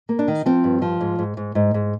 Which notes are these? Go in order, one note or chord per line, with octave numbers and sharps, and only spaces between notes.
A#3
D4
D#3
F3 C4
G2
F3
G#2
G#2
G#2
G#2
G#2